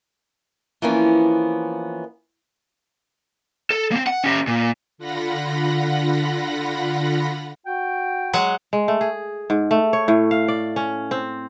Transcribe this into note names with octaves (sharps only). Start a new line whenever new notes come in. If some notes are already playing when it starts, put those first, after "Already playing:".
E3 F3 A#3 B3 C#4
A4
A#3 C4
F#5
C#4 G4
A#2
D3 F4 F#5 B5 A#6
F#4 G5
F#3 G#3 F#5
G#3
A3
G#4
G#2
A3
C#5
A2
F5
D5
C#4
C4